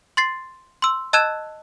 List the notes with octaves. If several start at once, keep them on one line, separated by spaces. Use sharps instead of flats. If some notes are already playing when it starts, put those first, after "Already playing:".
C6 A6 C7
C6 E6
D#5 A5 E6 F#6 G#6 E7